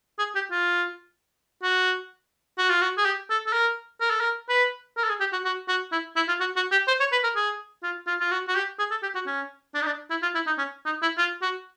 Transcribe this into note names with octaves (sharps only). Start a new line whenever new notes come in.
G#4
G4
F4
F#4
F#4
F4
F#4
G#4
G4
A4
A4
A#4
A#4
A4
A#4
B4
A#4
A4
G#4
G4
F#4
F#4
F#4
E4
E4
F4
F#4
F#4
G4
C5
C#5
B4
A#4
G#4
F4
F4
F4
F#4
F#4
G4
G#4
A4
G4
F#4
C#4
D4
D#4
D4
E4
F4
E4
D#4
C#4
D#4
E4
F4
F#4